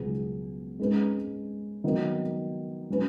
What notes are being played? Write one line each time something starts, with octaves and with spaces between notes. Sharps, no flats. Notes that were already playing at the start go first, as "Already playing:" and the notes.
Already playing: C#2 B2 F#3 B3 G#4
G#2 G#3 C#4 B4
D#3 F#3 B3 D#4
F#3 C#4 B4